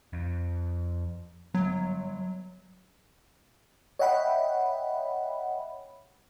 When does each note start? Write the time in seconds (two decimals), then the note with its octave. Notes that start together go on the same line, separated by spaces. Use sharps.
0.13 F2
1.55 F#3 G3 B3
3.99 C#5 D#5 E5 F#5 G5 B5